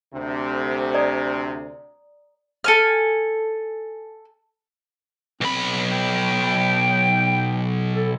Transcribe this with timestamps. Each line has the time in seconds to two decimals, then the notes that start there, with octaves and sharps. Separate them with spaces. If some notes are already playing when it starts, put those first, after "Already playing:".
0.13 D2 C3
0.94 D5 A#5 D#6
2.64 A4 G#5 F6
5.41 B1 C4 B5
5.91 G5
7.93 A4